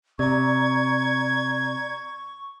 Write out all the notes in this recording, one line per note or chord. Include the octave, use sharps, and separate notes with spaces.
C3 D5 A#5 C#6 G#6